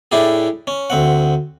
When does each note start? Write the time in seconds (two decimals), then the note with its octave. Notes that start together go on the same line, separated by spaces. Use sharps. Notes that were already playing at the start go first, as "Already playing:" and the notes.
0.12 A2 D4 E4 G4 G#4
0.67 C#4
0.90 D2 C4 F#5